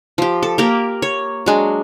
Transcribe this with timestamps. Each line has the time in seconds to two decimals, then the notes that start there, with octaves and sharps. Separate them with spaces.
0.18 F3 G4
0.43 A4
0.58 A#3 G4 A#4
1.02 C#5
1.46 F#3 G#3 D4